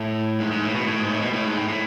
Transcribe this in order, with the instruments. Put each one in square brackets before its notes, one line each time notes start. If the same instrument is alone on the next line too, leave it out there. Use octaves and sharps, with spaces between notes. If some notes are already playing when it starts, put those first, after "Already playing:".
Already playing: [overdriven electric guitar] A2
G#2
G#2
A2
B2
A2
G#2
A2
B2
A2
G#2
A2
A2